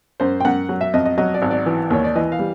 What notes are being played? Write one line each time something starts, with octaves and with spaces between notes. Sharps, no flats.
F#2 C5
G5
F#2 F#5
F#3
E5
F2 D#5
D#5
F#3 D#5
D5
G#1
D5
E3
D#2 C#5
D5
E3 D#5
F5
G3